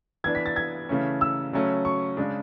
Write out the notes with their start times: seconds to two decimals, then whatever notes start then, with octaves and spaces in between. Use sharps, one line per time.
0.24 E3 B3 D4 G#6
0.35 B6
0.46 A6
0.56 G#6
0.89 C#3 E3 A3 C#4
1.21 E6
1.53 C#3 F#3 A3 C#4
1.85 C#6
2.17 C#3 G#3 D4